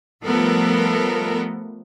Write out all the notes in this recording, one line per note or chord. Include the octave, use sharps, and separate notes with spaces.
F3 G3 A3 B3 A4 A#4